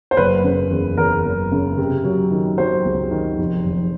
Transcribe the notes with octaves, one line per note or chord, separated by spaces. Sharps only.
C5
F#1 B4
C#3
E2
E2 A#4
F#1
C#3
C3
F#3
D#3
F#3 C5
C#2
D#3
F1
F1